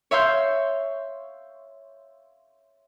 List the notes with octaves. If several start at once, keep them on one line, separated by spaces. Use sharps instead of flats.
C#5 E5 F5 C6 G6